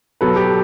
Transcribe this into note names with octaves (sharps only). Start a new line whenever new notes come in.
B2 F#3 A4 B4
G4 A4